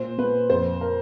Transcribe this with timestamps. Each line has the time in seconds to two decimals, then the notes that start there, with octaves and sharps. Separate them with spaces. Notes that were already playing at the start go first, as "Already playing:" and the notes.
Already playing: A#2 C5
0.18 A#2 B4
0.50 F2 C5
0.81 A#4